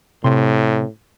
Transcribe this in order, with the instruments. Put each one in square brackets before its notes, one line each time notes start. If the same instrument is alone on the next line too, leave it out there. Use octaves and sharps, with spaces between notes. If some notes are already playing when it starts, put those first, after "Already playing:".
[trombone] A2 [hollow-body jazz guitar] C3 C6